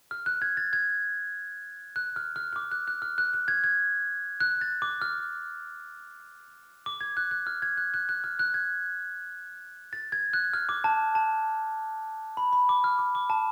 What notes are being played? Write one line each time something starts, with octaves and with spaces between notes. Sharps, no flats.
F6
F#6
G#6
A6
G#6
F#6
F6
F6
F6
D6
F#6
F#6
F6
F#6
F#6
G#6
G#6
F#6
A6
D6
F6
D6
G#6
F#6
F#6
F6
G#6
F#6
F#6
F#6
F6
F#6
G#6
A6
G#6
F#6
F6
D6
A5
A5
B5
B5
D6
F6
D6
D6
A5